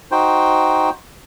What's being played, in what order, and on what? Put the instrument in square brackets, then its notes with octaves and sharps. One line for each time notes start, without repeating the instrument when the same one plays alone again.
[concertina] D#4 F#4 C5 G5